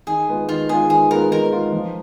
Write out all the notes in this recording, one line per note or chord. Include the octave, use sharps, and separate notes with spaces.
D#3 G#4
G#3 B3 F4
D#3 F4
G#3 B3 F4 G#4
D#3 G#4
G#3 B3 F4 A#4
D#3 A#4
G#3 B3 F4
F3